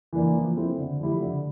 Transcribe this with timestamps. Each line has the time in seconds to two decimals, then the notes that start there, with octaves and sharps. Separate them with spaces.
0.13 E3 A#3 D4
0.35 F3
0.57 C4 E4 A4
0.78 D3
1.00 F3 A3 E4 G4
1.21 D3